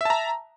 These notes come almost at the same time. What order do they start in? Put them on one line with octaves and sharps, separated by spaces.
E5 A5 A#5